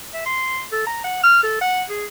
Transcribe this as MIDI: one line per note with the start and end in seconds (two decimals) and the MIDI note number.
0.14 0.24 76
0.26 0.62 84
0.72 0.86 69
0.87 1.02 82
1.04 1.23 78
1.24 1.41 89
1.43 1.61 69
1.61 1.82 78
1.90 2.05 68